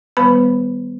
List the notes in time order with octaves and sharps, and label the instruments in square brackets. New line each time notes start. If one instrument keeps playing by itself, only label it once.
[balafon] D#3 G3 B3 B4 B5